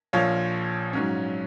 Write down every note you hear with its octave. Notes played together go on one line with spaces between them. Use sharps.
A#1 A#2 F3 C#5 F5
G#2 F#3 C#4